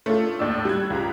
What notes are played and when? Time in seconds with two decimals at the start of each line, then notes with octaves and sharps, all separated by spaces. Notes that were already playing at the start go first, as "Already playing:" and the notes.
0.06 A3 C#4 D4 F4 A4
0.39 D#2 A2 D4 D5 E6
0.65 G3 F#6 G#6
0.90 C#2 F4 G4 A#5